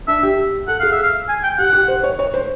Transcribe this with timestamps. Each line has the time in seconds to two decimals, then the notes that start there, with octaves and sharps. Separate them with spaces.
0.08 D4 E5
0.23 G4
0.68 A4 F#5
0.80 G#4 F5
0.92 E5
1.03 F5
1.29 G#5
1.43 G5
1.58 G4 F#5
1.73 G4
1.88 C5
2.04 C#5
2.19 C#5
2.34 C5